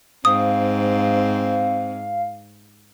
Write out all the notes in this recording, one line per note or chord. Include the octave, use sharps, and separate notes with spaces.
G#2 C4 F5 D#6